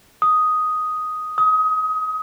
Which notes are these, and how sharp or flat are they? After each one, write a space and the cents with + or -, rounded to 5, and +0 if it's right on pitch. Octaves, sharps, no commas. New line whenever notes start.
D#6 +5
D#6 +25